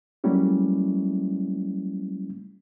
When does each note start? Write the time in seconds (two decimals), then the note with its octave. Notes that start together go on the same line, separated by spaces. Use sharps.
0.24 F#3 G3 A3 A#3 C#4 E4